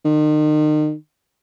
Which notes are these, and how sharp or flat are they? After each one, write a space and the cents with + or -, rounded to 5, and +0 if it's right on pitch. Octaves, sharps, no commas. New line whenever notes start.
D#3 -35